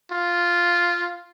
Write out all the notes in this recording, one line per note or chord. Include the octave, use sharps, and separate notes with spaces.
F4